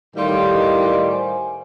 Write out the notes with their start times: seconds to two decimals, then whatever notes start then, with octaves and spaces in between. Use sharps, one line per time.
0.15 A2 D#3 G3 D#5 F5 C6
1.11 C5 G#5